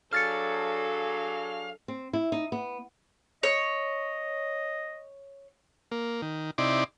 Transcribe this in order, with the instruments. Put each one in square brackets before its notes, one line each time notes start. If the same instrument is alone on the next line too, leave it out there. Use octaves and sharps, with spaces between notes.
[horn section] F#3 D4 G#4 [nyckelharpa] A4 [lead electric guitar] F5 [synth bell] F6 A6 C#7
[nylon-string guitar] C4
E4
D#4
B3
[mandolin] C#5 [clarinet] D#5
[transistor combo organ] A#3
D#3
C3 D#4 E4 D5 C6 D6